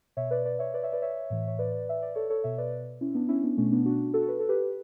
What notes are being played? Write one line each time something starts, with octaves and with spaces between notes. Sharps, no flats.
B2 C#5 E5
B4 D5
B4 D5
C#5 E5
B4 D5
C#5 E5
B4 D5
C#5 E5
A2 E3
C#5
B4 D5
E5
D5
A4 C#5
A4 C#5
B2 C#5 E5
B4 D5
C#4 E4
B3 D4
C#4 E4
B3 D4
B2 A3 C#4
B3 D4
D4 F#4
F#4 A4
B4
A4
G4 B4